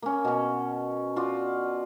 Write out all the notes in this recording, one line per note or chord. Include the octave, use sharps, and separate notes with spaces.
A#3 C#4
B2 C#4
F4 F#4 D5